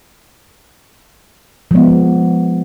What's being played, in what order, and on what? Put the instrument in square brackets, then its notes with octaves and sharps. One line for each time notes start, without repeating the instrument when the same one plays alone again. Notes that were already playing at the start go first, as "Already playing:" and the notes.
[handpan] F3 G#3 B3